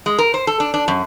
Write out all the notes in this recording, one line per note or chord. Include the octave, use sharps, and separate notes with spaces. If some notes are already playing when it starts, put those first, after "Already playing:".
G#3
A#4
C5
A4
D4
D4
F#2